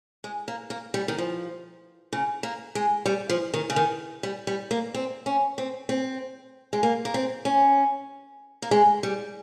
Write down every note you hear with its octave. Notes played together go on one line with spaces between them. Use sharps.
G#3
A#3
A#3
G3
D#3
F3
C#3
A#3
G#3
G3
F3
D#3
C#3
D#3
G3
G3
A#3
C4
C#4
C4
C4
G#3
A#3
A#3
C4
C#4
A#3
G#3
G3